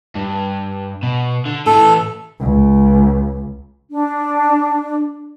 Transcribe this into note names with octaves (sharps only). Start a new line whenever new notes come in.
G2
B2
D3
A2 E3 A4
C#2
D4